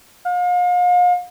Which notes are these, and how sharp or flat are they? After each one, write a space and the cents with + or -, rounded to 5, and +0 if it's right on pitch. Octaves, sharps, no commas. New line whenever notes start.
F5 +40